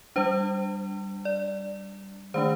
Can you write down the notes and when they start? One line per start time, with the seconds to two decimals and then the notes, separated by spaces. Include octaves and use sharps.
0.16 G3 D4 C5
1.25 D5
2.34 D#3 A3 D4 C5